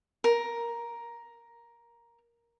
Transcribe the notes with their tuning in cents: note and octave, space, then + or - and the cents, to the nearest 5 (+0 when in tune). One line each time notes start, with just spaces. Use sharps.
A#4 +10